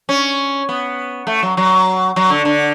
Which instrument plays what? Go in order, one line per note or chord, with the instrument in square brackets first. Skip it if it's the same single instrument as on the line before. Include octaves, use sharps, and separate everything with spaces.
[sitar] C#4
B3
A3
F#3
F#3
F#3
D3
D3